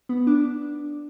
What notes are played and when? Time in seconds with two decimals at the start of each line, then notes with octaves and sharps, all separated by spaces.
0.09 B3
0.27 D4